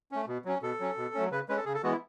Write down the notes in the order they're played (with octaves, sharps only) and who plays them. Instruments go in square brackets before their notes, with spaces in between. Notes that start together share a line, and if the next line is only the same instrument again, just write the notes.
[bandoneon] A3 C#4
B2
F#3 C#4
B2 A4
F#3 C#4
B2
F#3 A3 C#4
C#3 B4
G#3 C#4 B4
A4
C#3 G#4
A4
E3 G#3 B3 F#4
E4